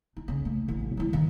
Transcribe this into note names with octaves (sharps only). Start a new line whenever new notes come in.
D#4
C#3 C#4
A3
A1
F#3 E4
D#3